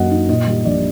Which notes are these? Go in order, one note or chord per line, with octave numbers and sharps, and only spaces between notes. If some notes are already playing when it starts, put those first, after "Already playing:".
Already playing: F#2 F#3 A#3 D#5 F#5
D#4
A#2 D#5
G3
A#1 D5